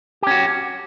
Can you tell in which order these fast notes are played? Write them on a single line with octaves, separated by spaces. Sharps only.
G4 C#4 F#4